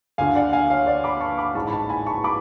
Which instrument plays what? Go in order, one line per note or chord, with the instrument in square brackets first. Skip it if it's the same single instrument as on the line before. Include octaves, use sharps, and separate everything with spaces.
[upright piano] D2 D3 F5 G#5
D5 F#5
F5 G#5
C#5 F5
D5 F#5
B5 D6
A5 C#6
B5 D6
A1 G#2 A5 C#6
B5
F#5 A5
G#5 B5
A5 C#6
B5 D6